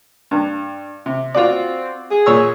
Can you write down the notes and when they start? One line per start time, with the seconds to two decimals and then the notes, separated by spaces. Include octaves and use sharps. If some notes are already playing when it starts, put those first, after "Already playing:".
0.31 G2
1.06 C3
1.35 C4 F4 F#4 D5
2.11 G#4
2.26 A#2 C#5 E6